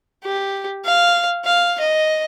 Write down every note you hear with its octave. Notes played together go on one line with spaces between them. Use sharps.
G4
F5
F5
D#5